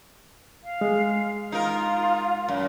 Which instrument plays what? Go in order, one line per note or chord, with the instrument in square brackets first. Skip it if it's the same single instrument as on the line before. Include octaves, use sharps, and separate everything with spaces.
[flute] F5
[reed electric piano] G#3
[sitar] D#4 A#4 [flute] F4 [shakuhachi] F5
[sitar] F#2